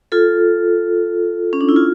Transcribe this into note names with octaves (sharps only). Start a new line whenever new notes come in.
F4 A4
C#4
D4
E4
F4